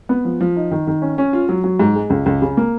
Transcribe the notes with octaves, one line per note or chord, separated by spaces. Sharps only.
B3
F3
F3
D#4
D#3
D#3
C#4
C#4
F4
F#3
F#3
G#2
G#3
C#2
C#2
C#3
A#3